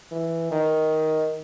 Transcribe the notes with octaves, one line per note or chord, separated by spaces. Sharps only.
E3
D#3